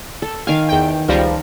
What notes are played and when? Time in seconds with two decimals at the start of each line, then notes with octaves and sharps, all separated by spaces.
0.22 A4
0.47 D#3 F5 G#5
0.69 E2 G5
1.08 C#2 F3 G3 A#4